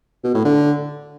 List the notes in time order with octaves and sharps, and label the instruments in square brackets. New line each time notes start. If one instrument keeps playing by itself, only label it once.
[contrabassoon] B2
A2
D3